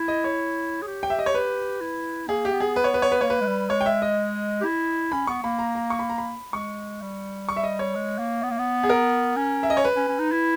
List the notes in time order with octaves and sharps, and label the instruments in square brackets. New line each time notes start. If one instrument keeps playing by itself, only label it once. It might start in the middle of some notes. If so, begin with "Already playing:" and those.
Already playing: [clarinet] E4
[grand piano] D#5
C#5
[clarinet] G#4
G4
[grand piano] G5
E5
D#5
C#5
B4
[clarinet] E4
[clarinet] A#3 [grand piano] G#4
[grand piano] G4
[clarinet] B3
[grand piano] G#4
B4
C#5
B4
C#5
B4
[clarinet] A#3 [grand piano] C#5
[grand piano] B4
[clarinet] G#3
G3
[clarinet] G#3 [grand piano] C#5
[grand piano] G5
E5
D#5
[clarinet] G4
E4
[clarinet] C#4 [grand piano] B5
[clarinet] B3 [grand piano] C#6
[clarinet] A#3 [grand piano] B5
[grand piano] A#5
A#5
C#6
B5
A#5
B5
[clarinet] G#3 [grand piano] C#6
[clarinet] G3
[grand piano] C#6
E5
D#5
C#5
[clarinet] G#3
A#3
B3
A#3
B3
[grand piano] G#4
A#4
[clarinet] C#4
[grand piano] E5
D#5
C#5
B4
[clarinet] C#4
C#4
D#4
E4